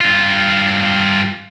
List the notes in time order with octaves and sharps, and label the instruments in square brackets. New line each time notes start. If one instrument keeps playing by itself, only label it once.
[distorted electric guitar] G2 F4